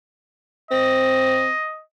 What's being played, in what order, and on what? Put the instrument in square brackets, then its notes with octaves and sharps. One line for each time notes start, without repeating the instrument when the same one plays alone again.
[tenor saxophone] C4 [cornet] D#5